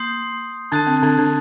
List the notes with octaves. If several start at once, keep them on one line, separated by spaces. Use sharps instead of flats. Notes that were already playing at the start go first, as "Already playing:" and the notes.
Already playing: A#3 C6 D#6 G6 C7
D3 D4 A5 D#6 F#6 A6
C4
D3 D4
D3 D4